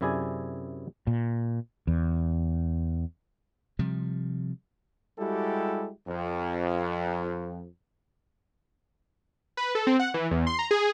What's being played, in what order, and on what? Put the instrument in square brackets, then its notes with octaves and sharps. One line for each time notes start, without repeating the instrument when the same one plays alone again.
[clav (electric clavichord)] F#2 C3 E4 G#4 D5 G#5
[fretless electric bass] A#2
E2
[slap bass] C3 F3 G3
[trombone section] G3 G#3 E4 F#4 G4 A4
F2
[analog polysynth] B4
A4
C4
F#5
E3
E2
C6
A#5
G#4